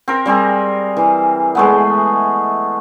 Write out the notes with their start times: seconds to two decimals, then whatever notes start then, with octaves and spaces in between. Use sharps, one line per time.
0.08 C4 A#4
0.25 G3 C4 G#4 A#4
0.97 E3
1.55 G#3 A3 B3